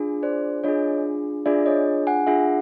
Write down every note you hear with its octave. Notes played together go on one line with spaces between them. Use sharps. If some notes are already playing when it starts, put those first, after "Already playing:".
Already playing: D4 F4 G#4
C5 D5
D4 F4 G#4 C#5 D#5
D4 F4 G#4 D5 E5
C#5 D#5
F#5 G#5
D4 F4 G#4 E5 F#5